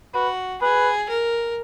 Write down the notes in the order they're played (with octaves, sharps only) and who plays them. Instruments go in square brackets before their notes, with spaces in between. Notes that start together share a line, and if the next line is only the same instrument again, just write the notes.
[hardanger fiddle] F#4 [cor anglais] B4
[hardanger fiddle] G#4 [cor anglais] B4
[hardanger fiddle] A#4